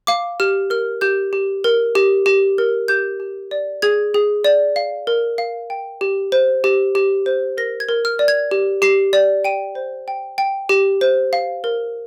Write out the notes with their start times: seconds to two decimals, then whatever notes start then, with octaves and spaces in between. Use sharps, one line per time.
0.07 F5 D6
0.40 G4 F6
0.70 A#4 F6
1.01 G4 G6
1.33 G4
1.64 A#4
1.95 G4
2.26 G4
2.58 A#4
2.88 G4 G6
3.20 G4
3.51 D5
3.82 G#4 G#6
4.14 G#4
4.44 D5
4.76 F5
5.07 A#4
5.38 F5
5.70 G5
6.01 G4
6.32 C5
6.64 G4
6.95 G4
7.26 C5
7.57 A#4 A#6
7.80 G#6
7.89 A#4
8.05 F6
8.19 D5
8.28 G#6
8.51 G4
8.82 G4 C7
9.13 D5
9.45 G5 D#7
9.75 C5
10.08 G5
10.38 G5
10.69 G4
11.01 C5
11.33 F5
11.64 A#4